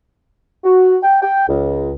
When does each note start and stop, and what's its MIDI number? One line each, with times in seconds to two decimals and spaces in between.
0.64 0.96 66
1.03 1.22 79
1.22 1.46 79
1.48 1.92 37